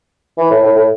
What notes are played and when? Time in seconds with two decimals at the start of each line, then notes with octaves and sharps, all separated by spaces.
0.38 E3
0.50 A2
0.63 A2
0.76 A2